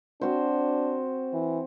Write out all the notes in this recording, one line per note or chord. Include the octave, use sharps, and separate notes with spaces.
C4 D4 F#4 C5
E3